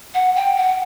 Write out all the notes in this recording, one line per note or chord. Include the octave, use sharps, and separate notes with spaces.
F#5
G5
F#5